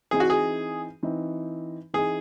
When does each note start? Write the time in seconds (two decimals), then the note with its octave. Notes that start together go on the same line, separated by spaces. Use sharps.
0.11 E3 C4 D#4 G#4
0.20 F#4
0.30 G#4
1.03 E3 C4 D#4
1.93 E3 C4 D#4 G#4